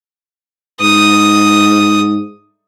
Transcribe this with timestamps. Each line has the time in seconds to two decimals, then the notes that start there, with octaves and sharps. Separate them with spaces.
0.81 G#2 D#6